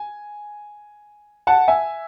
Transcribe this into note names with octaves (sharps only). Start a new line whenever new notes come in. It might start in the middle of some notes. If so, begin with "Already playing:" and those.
Already playing: G#5
F#5 A5
E5 G#5